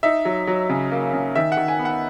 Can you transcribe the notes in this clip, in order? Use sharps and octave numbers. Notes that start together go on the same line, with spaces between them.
D#4 E5
F#3
F#3
C#3
A#3
C#3
D#3 E5
F#5
D#3
G#5
B3
F#5